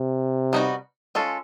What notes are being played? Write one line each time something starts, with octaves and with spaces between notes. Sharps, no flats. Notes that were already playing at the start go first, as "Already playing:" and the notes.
Already playing: C3
G3 B3 D#4 F#4
G#3 C#4 F4 A4